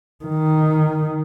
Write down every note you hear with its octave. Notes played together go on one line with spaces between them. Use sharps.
D#3